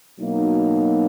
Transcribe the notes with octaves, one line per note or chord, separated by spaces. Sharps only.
B2 F#3 A#3 D#4